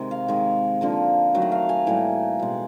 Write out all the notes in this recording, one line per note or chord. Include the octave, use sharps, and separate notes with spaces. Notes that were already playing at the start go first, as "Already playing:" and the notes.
Already playing: C3 D#3 G#3
F5
D#3 G#3
D3 F3 A#3
D#3 F#3 A3
F#5
F5
G#5
A2 E3 G3 A#3 G#5
B2 G#3